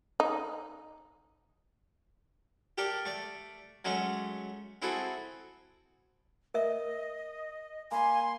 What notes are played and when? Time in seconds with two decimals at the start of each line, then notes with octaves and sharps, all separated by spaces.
0.20 D#4
2.78 G4 A4 A#4 D5
3.05 A3 D5
3.85 F#3 G#3 A3 C#4
4.82 C4 E4 F#4 G#4 A4
6.54 A#4 D#5 E5
7.91 A#3 G#5 B5 C6